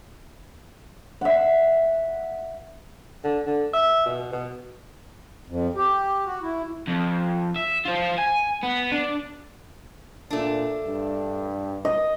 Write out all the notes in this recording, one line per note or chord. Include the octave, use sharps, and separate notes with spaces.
E5 F#5
D3
D3
E5
B2
B2
F2
G4
F#4
E4
F2
E5
F4 C5
G#5
B3
D4
A#2 A3 D4
G2
D#5